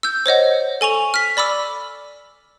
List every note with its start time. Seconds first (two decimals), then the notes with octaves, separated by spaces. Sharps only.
0.03 E6 G6
0.26 C5 C#5 D#5 F#5
0.81 A4 G#5 C#6 F7
1.14 F6 B6
1.37 D5 B5 D6 E6